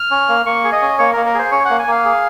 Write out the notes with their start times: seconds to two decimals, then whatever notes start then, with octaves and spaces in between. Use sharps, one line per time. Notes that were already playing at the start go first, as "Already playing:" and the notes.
Already playing: F6
0.11 C#4
0.29 A#3
0.46 A#3 C#6
0.64 G#4
0.72 D#5
0.82 C#4
0.99 A#3 C#5
1.13 A#3 A#4
1.26 A#4
1.34 G#4 C5
1.51 C#4 C#5
1.65 A#3 F#5
1.79 G#5
1.87 A#3 F5
2.05 G#4